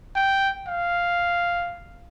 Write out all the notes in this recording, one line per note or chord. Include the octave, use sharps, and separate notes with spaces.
G5
F5